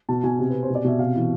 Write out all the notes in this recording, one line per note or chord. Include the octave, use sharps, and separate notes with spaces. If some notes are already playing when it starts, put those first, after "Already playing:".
B2 A5
B2 G#5
C3
C3 B4
C5
B2
D5
B2 E5
C3 F5
E3